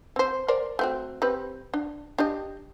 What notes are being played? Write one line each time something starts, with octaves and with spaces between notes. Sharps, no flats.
C4 C5
A#4 C5 D5
A3 C4 F#4
C4 G4 B4
D4
D4 G4 D#5